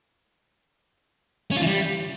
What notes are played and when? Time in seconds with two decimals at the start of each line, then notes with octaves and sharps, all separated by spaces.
1.51 C#4
1.56 F4
1.61 E3
1.66 G3